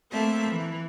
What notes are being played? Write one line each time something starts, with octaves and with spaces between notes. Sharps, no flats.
A3 A#3 C4 A4 E5
E3